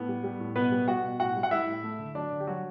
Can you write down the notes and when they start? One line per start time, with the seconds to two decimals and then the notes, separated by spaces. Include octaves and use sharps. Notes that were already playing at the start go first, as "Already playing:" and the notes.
Already playing: A2 B3
0.08 G3
0.24 G3
0.40 A2
0.56 B2 B3 B4
0.71 G3
0.88 G3 F#4 F#5
1.03 B2
1.19 A2 F#4 F#5
1.36 G3
1.43 F#5
1.51 G3 E4 E5
1.68 A2
1.83 A3
1.99 D3
2.15 F#3 D4 D5
2.32 D3
2.40 G4
2.47 F#3 G3 F#4